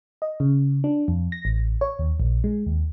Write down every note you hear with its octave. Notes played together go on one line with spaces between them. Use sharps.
D#5
C#3
D4
F2
A#6
A1
C#5
D#2
A#1
G#3
D#2